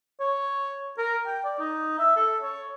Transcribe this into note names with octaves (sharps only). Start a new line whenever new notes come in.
C#5
A#4
G5
D5
D#4
E5
A4
C#5